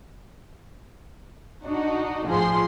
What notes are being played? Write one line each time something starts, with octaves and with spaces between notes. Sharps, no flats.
D4 D#4 F#4
A1 F3 G#4 C6